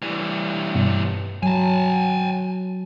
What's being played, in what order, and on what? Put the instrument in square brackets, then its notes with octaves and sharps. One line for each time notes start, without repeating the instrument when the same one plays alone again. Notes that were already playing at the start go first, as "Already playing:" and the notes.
[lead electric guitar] E3 G3
[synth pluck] G2 B2
[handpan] F#3 [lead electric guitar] G#5 A5